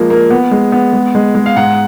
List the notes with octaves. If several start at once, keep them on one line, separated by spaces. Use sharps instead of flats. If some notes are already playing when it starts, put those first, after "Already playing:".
Already playing: F3 G#3 A#3
A#3
B3
G#3
B3
G#3
G#3
G#3
F5
G#2 F#5